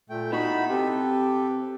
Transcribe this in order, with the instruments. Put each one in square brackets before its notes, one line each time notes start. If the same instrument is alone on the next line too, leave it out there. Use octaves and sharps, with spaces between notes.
[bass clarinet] A#2 [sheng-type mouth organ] A3 G5
[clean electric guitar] B3 E4 F#4 [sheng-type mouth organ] D#4 B5
[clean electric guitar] C3 [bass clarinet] G4 [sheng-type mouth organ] A4 B4